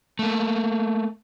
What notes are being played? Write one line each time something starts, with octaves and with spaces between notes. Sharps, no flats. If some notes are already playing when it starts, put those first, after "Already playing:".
A3 A#3